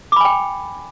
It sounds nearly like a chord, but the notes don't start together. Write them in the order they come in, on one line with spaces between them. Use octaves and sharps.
D6 B5 G#5 G5